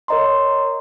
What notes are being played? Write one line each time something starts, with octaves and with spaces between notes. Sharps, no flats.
A#4 C#5 D#5 A#5 C6